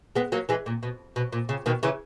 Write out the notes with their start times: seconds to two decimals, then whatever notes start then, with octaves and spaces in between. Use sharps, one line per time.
0.16 G#3 B3
0.32 F#3 A#3
0.49 E3 G#3
0.66 A#2
0.83 B2
1.16 B2
1.33 A#2
1.49 C#3
1.66 B2 D#3
1.83 C#3 E3